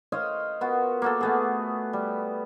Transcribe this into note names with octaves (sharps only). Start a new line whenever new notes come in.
C5 C#5 D#5 F5
B3 F4 F#4 A#4
A#3 F#4 A4
A3 B3 G#4
G3